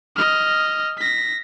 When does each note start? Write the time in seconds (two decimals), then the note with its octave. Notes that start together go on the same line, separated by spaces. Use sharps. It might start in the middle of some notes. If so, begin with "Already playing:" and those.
0.16 D#5 F6
0.98 A#6 B6